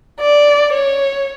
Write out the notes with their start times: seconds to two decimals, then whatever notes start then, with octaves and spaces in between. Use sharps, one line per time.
0.20 D5
0.73 C#5